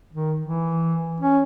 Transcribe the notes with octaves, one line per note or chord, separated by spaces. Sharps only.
D#3
E3
C#4